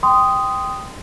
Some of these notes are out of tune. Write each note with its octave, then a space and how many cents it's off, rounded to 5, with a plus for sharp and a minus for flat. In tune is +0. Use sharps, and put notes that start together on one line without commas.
G5 +0 C6 -20 D#6 +0